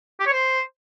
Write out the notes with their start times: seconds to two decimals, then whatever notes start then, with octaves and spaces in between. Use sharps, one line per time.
0.20 G4
0.26 C#5
0.33 C5